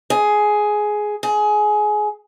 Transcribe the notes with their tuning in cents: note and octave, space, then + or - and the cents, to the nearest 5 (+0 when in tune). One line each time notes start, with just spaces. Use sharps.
G#4 +10
G#4 +20